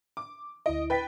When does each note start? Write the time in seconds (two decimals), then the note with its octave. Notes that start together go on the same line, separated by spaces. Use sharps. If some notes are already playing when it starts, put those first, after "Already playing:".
0.17 D6
0.66 D2 E4 D#5 D7
0.90 B4 G5 A6 B6